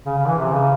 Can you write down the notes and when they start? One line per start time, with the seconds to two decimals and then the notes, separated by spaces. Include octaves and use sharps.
0.06 C#3
0.17 C#3
0.28 E3
0.38 C3
0.54 C#3